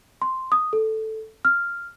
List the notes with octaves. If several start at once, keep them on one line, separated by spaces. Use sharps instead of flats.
C6
D#6
A4
F6